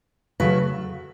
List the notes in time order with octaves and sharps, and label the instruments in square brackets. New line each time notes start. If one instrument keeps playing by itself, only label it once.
[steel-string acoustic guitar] C#3 F#3 A3 B4